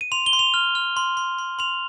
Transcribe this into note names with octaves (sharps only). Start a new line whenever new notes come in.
D#7
C6 F7
G7
C6
F7
F6
F6
C6
C6
C6
C6 F7